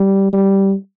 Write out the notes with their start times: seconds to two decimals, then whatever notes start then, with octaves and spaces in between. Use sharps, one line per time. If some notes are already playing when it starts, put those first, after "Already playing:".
Already playing: G3
0.33 G3